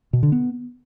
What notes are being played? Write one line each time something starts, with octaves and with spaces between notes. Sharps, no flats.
B2
D3
B3